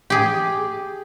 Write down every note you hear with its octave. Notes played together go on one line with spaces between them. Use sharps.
G4 G#4